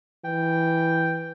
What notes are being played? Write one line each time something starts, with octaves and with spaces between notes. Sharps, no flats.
E3 G5